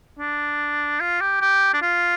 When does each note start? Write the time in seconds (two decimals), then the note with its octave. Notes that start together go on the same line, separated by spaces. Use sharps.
0.19 D4
1.00 F4
1.21 G4
1.41 G4
1.74 D4
1.82 F4